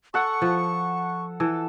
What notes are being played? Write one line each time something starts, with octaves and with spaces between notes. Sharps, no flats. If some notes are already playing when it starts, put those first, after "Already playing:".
A4 F#5 C#6
F3
E3 A4